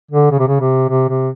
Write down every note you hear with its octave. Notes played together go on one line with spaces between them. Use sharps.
D3
C#3
C3
C#3
C3
C3
C3